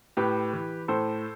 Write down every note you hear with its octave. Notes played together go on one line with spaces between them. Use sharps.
A2 G4 B4
E3
A2 A4 C5